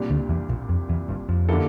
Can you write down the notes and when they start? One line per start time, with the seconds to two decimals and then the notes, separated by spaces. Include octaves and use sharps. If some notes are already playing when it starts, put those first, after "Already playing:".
Already playing: C2 A#2 G3 D4
0.10 D2 D3
0.29 E2 E3
0.49 A#1 A#2
0.69 F2
0.89 E2 E3
1.08 G1 G2
1.29 F2
1.49 D3 G3 A#3 E4 A4